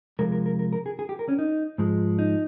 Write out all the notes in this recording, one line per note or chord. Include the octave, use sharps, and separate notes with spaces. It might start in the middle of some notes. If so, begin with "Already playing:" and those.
C3 F3 G#3 A#4
A#4
A#4
A#4
A#4
G#4
G#4
G4
A#4
C#4
D#4
G#2 F3 G#3
D#4